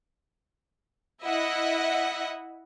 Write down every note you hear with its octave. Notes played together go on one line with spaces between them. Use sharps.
E4 D#5 E5 F#5